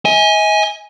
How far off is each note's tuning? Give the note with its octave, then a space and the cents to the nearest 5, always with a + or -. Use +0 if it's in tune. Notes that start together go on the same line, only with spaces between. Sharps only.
D#5 +45 G#5 +0